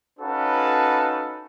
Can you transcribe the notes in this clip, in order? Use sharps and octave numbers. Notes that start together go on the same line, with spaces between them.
C#4 D#4 F#4 A4 B4 F5